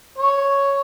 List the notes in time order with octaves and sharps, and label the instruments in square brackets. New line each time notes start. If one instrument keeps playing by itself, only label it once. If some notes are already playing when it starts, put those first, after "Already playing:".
[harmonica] C#5